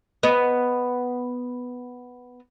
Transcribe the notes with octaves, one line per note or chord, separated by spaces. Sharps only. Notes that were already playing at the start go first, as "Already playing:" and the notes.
B3 D#5